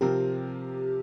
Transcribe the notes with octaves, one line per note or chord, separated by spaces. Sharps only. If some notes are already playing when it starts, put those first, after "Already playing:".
C3 F3 C4 G4 A#4